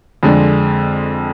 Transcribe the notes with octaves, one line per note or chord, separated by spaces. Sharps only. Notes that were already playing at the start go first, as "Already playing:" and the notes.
F2 D3 G#3 D4